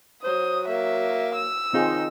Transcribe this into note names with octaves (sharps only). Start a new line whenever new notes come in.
F#3 C5 D#6
A#3 E5
E6
D#3 C4 D#4 F4 G#4